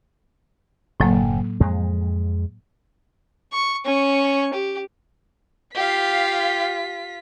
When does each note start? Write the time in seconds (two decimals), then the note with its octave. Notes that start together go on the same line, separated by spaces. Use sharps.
1.00 F#1 A2 F#3 A#3
1.60 F2 G#3
3.53 C#6
3.85 C#4 C#6
4.54 G4
5.75 F4 G4 F5 B6